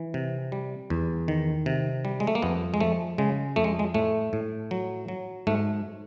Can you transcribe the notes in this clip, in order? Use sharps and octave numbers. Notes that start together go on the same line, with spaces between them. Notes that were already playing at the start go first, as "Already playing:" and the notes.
Already playing: E3
C3
G3
E2
D#3
C3
G3
G#3
A3
A#3
F2 B3
G#3
F3 A3
C#3 G#3
F2 A3
G#3
G#3
A2 A3
A2
F#3
F#3
G#2 A3